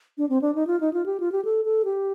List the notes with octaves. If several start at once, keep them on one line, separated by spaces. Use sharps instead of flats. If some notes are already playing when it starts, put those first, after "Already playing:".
D4
C4
D4
D#4
F4
D#4
F4
G4
F4
G4
A4
A4
G4